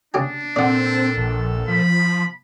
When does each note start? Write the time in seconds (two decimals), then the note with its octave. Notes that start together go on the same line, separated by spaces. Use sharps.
0.14 C#3 D4 G4 G#5
0.56 A#2 C4 A4 D5 F#5 E6
1.17 A#1
1.68 F3 B5